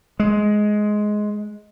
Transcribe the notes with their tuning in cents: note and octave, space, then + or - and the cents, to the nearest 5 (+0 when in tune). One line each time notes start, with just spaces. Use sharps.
G#3 +10